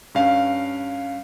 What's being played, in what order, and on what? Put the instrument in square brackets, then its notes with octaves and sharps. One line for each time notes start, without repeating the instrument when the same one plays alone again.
[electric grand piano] G2 C#4 F5